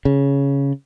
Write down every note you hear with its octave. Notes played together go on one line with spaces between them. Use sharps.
C#3